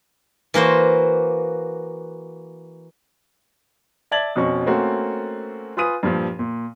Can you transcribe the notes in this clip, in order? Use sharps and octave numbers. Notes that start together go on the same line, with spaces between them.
E3 A#3 F#4 C5
D5 E5 A5 G#6 A6 F#7
F2 B2 C#4 C#6
A3 A#3 C4 C#4 F#4
F4 B4 G#5 D#6 D#7
G2 A#2 F3
A#2